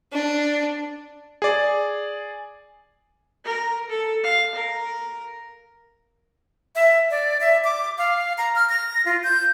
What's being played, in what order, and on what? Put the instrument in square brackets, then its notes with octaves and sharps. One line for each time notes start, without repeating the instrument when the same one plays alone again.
[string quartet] D4
[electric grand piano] G#4 D5
[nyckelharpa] A#4
A4
F5
A#4
[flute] E5
D5
E5
D6
F5
A#5
F6
A#6
F4
G6